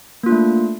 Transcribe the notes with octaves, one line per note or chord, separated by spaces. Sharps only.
A3 A#3 D4 F4